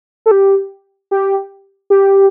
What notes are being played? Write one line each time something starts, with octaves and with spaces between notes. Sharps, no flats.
A4
G4
G4
G4